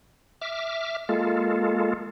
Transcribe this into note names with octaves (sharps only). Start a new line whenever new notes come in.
E5 D6 F6
G#3 A#3 F4 A4